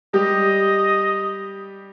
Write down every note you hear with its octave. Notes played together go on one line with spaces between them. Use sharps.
G3 G4 D#5